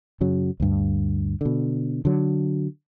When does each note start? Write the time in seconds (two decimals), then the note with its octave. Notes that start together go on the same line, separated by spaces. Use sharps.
0.21 F#2 C#3 F#3
0.60 D2 G2
1.41 B2 D3
2.05 D3 F#3